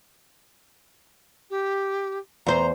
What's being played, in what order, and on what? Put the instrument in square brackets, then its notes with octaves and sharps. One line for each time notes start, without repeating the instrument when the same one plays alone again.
[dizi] G4
[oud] E2 C5 [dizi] A#5